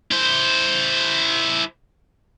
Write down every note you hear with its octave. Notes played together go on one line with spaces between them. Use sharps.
E4 C5